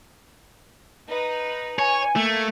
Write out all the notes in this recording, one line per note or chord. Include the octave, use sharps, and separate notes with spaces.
D#4 B4
C#5 G#5
A3 A#3 G#6 C#7